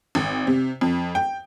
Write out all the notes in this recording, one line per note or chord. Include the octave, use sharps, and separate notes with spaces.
G#1
C3
F2
G5